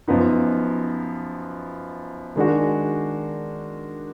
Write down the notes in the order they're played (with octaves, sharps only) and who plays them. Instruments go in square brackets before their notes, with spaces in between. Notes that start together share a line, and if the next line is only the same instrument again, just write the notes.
[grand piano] F#2 F3 B3 D#4
D#3 G#3 D4 F#4